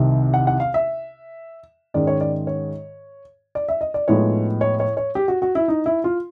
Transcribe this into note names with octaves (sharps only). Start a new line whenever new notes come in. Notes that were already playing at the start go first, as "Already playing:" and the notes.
Already playing: C2 C3 D#3
F#5
F#5
F5
E5
G#2 D#3 G#3 C#4 D5
C#5
D5
C#5
D5
E5
D#5
D5
A2 F3 G#3 B3 D#4 C#5
C#5
C#5
C#5
G4
F#4
F#4
E4
D#4
E4
F4